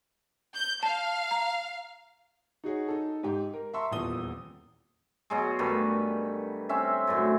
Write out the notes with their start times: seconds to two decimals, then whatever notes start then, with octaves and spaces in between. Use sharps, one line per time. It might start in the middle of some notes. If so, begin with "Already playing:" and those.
0.54 G6
0.83 F5 A5
1.31 A#5
2.64 D#4 F#4 G#4 C#5
2.88 D#4 A4
3.23 G#2 G4
3.54 A#4
3.74 E5 A5 A#5 C6 C#6 E6
3.91 D#1 E2 A#2 D#6 G7
5.30 B2 F#3 G#3
5.59 G2 D#3 A3 B4
6.69 C4 C#4 E5
7.07 F#2 A2 D3